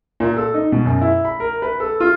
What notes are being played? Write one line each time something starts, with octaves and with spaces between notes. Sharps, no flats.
A#2
A4
D#4
B2
F#2
E4
B5
A#4
B4
A4
F4